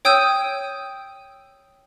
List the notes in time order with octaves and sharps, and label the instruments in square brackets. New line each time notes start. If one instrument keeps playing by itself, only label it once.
[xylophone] C#5 G5 D#6 E6 G6 D#7